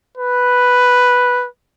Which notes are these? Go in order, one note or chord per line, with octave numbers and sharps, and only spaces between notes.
B4